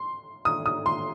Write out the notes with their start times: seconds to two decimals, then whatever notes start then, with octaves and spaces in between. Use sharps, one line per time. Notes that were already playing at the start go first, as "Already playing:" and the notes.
Already playing: C6
0.45 D#6
0.66 D#6
0.86 C6